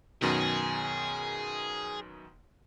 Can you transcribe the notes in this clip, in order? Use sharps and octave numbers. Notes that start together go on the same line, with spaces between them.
F#2 B2 D#3 G#4